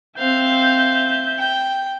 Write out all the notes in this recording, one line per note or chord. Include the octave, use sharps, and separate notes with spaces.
C4 E5 F5 G6
G5